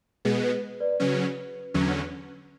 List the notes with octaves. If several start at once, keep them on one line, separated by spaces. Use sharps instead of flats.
B2 G#3 B3 G#4
B4
B4 D5
C#3 F#3 C#4 B4
E2 D3 F#3 C#4